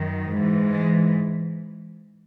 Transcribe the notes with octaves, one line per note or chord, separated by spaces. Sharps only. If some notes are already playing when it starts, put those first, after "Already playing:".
Already playing: F#2 D#3
G#2 E3
G#3